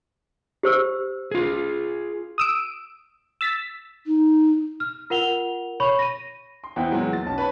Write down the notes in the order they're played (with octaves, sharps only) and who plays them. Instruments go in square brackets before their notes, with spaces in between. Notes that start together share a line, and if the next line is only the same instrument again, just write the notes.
[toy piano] G4 C5 E6
[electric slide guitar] F4 G#4
[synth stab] D#6 E6 D7
E6 A6 B6
[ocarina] D#4
[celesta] F6
F4 A#4 F#5 F7 G7
C#5 B5 C#6
A#6 D#7
[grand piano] C6
E2 B3 E4 B4 C5 G5
E2 A#2 F#3 G#3
A6
B1 C#4 A5
B4 C#5 A5 B5